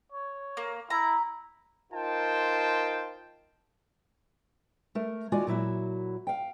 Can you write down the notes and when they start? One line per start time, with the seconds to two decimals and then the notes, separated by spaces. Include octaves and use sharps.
0.12 C#5
0.57 A#3
0.90 E4 A#5
1.92 D#4 F4 A#4 C5 G5 A5
4.95 A3 A#4
5.32 D#2 G#3 F4 F#4 D5 G#5
5.47 A#2 F#3 E4 F#4
6.27 F5 G5